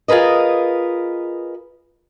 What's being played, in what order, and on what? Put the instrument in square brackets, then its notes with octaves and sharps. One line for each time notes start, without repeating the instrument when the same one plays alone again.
[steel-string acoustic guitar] F4 G#4 A#4 B4 D#5